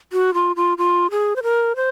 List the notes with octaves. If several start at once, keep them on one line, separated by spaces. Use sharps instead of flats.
F#4
F4
F4
F4
G#4
C5
A#4
C5